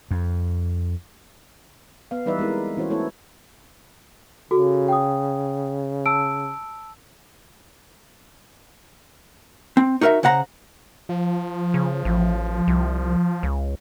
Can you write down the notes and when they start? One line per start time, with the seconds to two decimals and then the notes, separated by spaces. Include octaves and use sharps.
0.11 F2
2.11 B3 F5
2.26 E3 G3 D#4 B4 D5 E5
2.39 G#3 C4 E4 A#4
2.77 E3 C#4 F#4 C5 C#5
2.90 A3 B3 E4 A4 C#5
4.51 C#3 F#4 A4
4.88 G5 D#6
6.06 A5 E6 D7
9.77 C4
10.01 D#4 F#4 A#4 D#5 E5
10.23 C#3 C5 F#5 A#5
11.09 F3
11.74 C#3
12.05 A1
12.68 C2
13.43 C#2